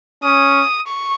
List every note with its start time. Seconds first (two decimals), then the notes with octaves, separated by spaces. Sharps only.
0.23 C#4 D#6
0.87 C#6